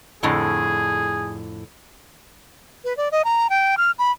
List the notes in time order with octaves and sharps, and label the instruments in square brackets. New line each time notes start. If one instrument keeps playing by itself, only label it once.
[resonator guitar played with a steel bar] F2 A2 D3 [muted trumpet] G#4
[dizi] B4
D5
D#5
A#5
G5
F6
B5